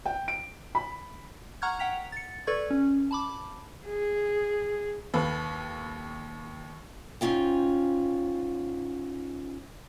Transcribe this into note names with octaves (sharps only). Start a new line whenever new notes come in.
G5
D7
B5
F#5 A#5 C#6 F6 F#6 G#6
F#5 G5 B6 F7
A6 C#7
A4 B4 D5 C#6 G#6
C#4
A5 B5 D6
G#4
D#2 A4 B4 F5 B5
G#2 E3 C#4 F4 G5